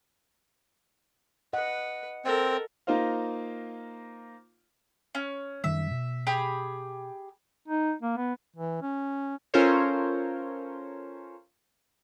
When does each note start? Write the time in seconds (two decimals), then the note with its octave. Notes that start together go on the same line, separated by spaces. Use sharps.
1.53 B4 D#5 F#5
2.25 C4 A4 A#4
2.87 A#3 D#4 F4 C5 F5
5.15 C#4
5.64 F#2 D#3 G3 E5
5.91 B2
6.27 G4 G#4 B5
7.68 D#4
8.02 A#3
8.17 B3
8.56 E3
8.82 C#4
9.54 C#4 F4 A4 A#4 C5 C#5